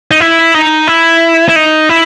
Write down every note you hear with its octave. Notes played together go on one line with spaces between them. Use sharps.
D#4
E4
D#4
E4
E4
D#4
E4